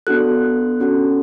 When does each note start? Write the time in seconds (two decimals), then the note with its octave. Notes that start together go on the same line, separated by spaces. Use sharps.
0.07 B3 D4 F#4 A4 F#6
0.80 C#4 F#4 A4